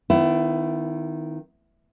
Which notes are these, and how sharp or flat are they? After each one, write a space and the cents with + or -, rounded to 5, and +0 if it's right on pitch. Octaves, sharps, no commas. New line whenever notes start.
D#3 +0 B3 +40 E4 +20